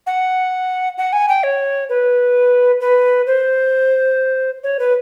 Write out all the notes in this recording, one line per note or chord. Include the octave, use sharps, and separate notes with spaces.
F#5
F#5
G#5
G5
C#5
B4
B4
C5
C#5
B4